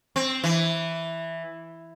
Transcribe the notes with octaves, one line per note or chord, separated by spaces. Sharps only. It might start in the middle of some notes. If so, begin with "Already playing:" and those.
C4
E3